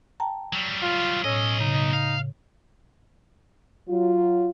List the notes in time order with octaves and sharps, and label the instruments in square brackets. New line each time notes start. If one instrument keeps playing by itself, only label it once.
[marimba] G5 A5 A#5
[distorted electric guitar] F#3 G3
[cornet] F4
[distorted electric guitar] B1 D#5 [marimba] A2 C#5 E6 [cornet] C#4
[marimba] C#3 [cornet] D#4
[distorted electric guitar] F5
[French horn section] F#3 F4